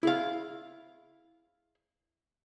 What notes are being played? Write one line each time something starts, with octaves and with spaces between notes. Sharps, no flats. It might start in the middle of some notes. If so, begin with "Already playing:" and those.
E4 G#4 F5